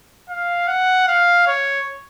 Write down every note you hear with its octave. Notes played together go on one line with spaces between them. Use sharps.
F5
F#5
F5
C#5